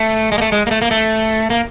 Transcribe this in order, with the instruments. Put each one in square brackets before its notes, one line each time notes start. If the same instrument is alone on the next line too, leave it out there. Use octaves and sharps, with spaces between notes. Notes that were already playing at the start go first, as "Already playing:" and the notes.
Already playing: [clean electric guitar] A3
G#3
A#3
A3
G#3
A#3
A3
A#3
A3
A#3